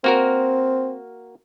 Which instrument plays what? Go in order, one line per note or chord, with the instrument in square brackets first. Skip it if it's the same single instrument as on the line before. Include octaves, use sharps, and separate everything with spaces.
[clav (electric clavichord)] A#3 F#4 A#4 [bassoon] C4